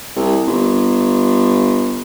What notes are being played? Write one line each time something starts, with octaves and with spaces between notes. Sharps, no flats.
C2
G1